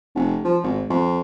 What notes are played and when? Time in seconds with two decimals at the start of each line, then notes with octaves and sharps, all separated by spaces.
0.15 F1
0.45 F3
0.63 G#1
0.90 F2